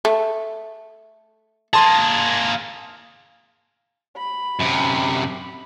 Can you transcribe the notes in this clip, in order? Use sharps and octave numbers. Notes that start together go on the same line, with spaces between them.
A3
A#3 G#4 A5 C6 A6
B5
F#2 C3